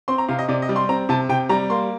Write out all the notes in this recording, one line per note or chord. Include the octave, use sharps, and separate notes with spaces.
C4 C6
A#5
C3 F5
D#5
C3 D5
D#5
G3
C6
C4 A#5
C3 A5
C3 G5
G3 A#5
A#3 C6